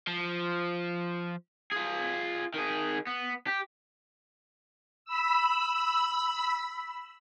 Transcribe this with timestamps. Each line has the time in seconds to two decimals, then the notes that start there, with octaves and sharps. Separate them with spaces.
0.07 F3
1.72 F4 G#4
2.54 D#3 G#4
3.07 B3
3.47 G4
5.05 B5 E6